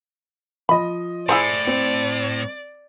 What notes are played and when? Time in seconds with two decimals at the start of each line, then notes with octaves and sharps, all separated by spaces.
0.69 F3 D#5 B5
1.29 A2 E4 G#4 C5 D5
1.67 C4